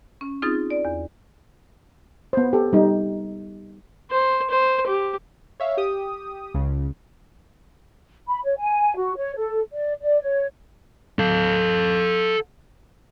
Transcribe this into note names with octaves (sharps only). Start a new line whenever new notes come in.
C#4
C4 D#4 F4 G#4 D#6 A6
D5
E2
B3 C5
G4 A4
G3 D#4
C5
C5
G4
C#5 E5 F5
G4 D#6
C#2 C#3
B5
C#5
G#5
F#4
C#5
A4
D5
D5
C#5
A4 F5